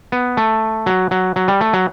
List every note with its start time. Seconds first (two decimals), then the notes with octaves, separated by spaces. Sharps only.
0.12 B3
0.37 A3
0.86 F#3
1.11 F#3
1.36 F#3
1.48 G3
1.61 A3
1.73 F#3